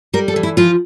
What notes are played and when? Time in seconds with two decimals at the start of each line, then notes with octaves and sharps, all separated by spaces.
0.13 G3 A#4
0.28 A4
0.36 E3
0.43 E4
0.57 F3 F4